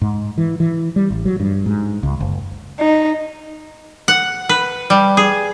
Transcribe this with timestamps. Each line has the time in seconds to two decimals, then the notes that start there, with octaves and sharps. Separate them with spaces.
0.02 G#2
0.38 E3
0.60 E3
0.96 G3
1.11 A1
1.25 F#3
1.40 G2
1.66 G#2
2.03 C#2
2.20 F#1
2.79 D#4
4.08 F#5
4.49 B4
4.90 G3
5.17 G#4